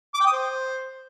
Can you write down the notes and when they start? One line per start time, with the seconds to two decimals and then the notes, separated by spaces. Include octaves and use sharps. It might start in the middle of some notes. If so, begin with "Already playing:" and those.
0.14 D6
0.20 G5
0.26 D#6
0.33 C5